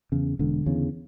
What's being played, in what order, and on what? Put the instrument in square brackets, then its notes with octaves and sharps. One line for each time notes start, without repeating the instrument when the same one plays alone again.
[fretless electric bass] E2 C#3
E1 D3
E2 C#3